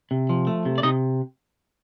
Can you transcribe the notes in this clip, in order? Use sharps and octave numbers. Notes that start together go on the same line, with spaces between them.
C3
F3
A3
C3
D5
C3 D#4 D#5